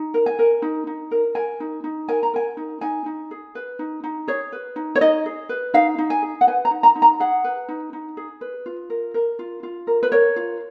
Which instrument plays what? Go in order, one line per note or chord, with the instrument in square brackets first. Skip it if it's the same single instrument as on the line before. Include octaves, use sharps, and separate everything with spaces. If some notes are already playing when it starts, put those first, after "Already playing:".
Already playing: [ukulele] D#4
A#4
G#5
A#4
D#4
D#4
A#4
A#4 G#5
D#4
D#4
A#4 G#5
A#5
A#4 G#5
D#4
D#4 G#5
D#4
G#4
B4
D#4
D#4
G#4 C#5
B4
D#4
C#5
D#4 D#5
G#4
B4
D#4 F5
D#4
G#5
G#4
F#5
B4 G#5
A#5
D#4
A#5
D#4
A#5
G#4 F#5
B4
D#4
D#4
G#4
B4
F4
A#4
A#4
F4
F4
A#4
B4
A#4 C#5
F4